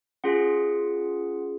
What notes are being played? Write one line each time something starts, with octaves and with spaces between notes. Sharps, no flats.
C#4 F4 G#4 F#5